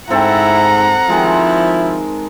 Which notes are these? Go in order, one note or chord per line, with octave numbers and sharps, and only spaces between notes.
G#2 C4 E4 A4 F#5 A#5
D#3 F3 G#3 E4